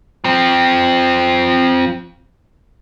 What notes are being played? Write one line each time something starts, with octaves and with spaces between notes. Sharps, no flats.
F3 C4